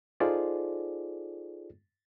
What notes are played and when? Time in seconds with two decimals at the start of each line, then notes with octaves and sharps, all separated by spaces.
0.20 D#4 F4 G#4 A4 C5 D5